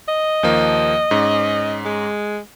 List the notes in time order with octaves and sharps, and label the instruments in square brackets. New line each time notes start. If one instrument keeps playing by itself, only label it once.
[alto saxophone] D#5
[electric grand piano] D#2 F3 A#3
G#2 C#4
[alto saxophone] G#3